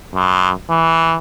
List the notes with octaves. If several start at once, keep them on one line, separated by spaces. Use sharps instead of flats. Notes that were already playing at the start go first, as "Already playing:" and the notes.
F#2
E3